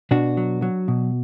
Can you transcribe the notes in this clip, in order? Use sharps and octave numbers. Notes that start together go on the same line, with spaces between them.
B2 D4 F#4
F#3
F#3
B2